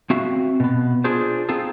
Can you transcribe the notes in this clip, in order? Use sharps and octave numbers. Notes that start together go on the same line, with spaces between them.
C4 F#4 E5 F5
B2 B3
D4 F4 G#4 C5
C4 D#4 F4 G#4 A4